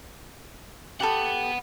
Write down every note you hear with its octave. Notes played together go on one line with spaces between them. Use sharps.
G4 A4 F#5 B5